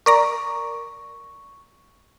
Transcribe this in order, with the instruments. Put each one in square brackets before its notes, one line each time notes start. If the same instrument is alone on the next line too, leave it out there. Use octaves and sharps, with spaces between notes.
[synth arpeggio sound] A#4 D5 A#5 [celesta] C#6